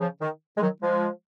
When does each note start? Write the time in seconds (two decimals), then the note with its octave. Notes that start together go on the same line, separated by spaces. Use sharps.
0.01 C#3 F3
0.21 D#3
0.58 G#3
0.62 D#3 F#3
0.83 F3 G#3